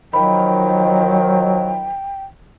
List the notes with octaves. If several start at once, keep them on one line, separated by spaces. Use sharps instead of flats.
D#3 F3 F#3 G5 B5